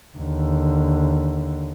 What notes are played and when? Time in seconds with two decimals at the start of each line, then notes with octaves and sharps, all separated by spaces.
0.18 D#2 D3